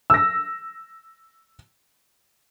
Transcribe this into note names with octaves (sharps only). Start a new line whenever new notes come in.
E6 A#6